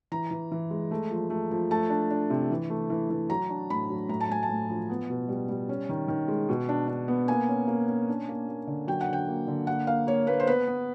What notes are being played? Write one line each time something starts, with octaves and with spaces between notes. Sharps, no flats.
E3 A#5
E3
E3
G#3
A3
F3
A3
F3
A3 A5
D4
D4
C3
E3
A3
E3
E3
F#3 A#5
D4
A2 B5
F#3
A2 A#5
A5
A2 G#5
A5
A2
F3
B3
B2
G3
G3
C#4
D#3
D#3
G#3
B2
D4
D4
B3
A#3 G#5
C#4
A#3
C#4
D4
A#3
A#3
D3
F#3 G5
F#5
D3 G5
A#3
D3
A#3 F#5
A#3 F5
A#3 C#5
A#3 B4
C5
B3 B4
B3